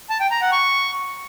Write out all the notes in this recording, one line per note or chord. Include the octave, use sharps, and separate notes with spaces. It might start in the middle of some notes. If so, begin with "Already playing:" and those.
A5
G5
A#5
F#5
C#6